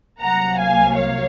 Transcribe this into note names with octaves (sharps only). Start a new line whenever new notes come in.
C2 C3 F#3 A#3 F#5 A#5
F5 G#5
C#5 F5